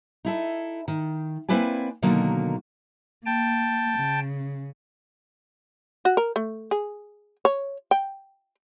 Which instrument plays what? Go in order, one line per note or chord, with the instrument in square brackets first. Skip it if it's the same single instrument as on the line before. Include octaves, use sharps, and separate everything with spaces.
[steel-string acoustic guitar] D#4 E4 A4
D#3
A#3 C4 E4 B4 D5 G#5
B2 D3 D#3 F#3 A#3
[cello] A#3 [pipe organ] G5 A5
[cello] C#3
[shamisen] F#4
A#4
A3
G#4
C#5
G5